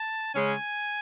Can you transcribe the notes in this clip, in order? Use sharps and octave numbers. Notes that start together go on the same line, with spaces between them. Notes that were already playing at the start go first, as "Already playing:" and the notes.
Already playing: A5
C#3 G#3 C#4 G#5